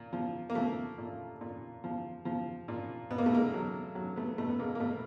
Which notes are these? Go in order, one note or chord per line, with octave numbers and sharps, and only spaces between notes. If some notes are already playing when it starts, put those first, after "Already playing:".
Already playing: A#2
F3
A#3
F3 A3
A#2
A#2
F3
F3
A#2
B2 B3
A#3
A3
G#3 A#3
F#3
F#3
A3 B3
B2 A3 B3
B3
G#3 A#3
A#3
B2 A3